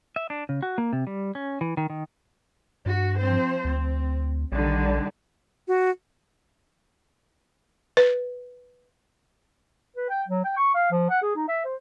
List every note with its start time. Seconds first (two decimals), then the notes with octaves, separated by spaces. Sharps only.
0.16 E5
0.30 D4
0.49 C#3
0.62 F#4
0.78 A#3
0.93 C3
1.07 G3
1.35 C#4
1.61 E3
1.77 D#3
1.90 D#3
2.86 G2 F#4
3.18 F3 C4 C5
3.65 D2 C4
4.52 A#1 D3 D#3 G3
5.68 F#4
7.97 B4
9.96 B4
10.10 G5
10.28 F#3
10.45 G5
10.57 C#6
10.74 F5
10.91 F3
11.10 F#5
11.22 G#4
11.36 D#4
11.48 E5
11.65 C5